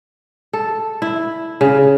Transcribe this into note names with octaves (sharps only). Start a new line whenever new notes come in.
A4
E4
C#3